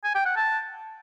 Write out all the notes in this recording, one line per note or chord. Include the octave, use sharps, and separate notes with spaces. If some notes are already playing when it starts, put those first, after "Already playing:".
G#5
G5
F#5
A5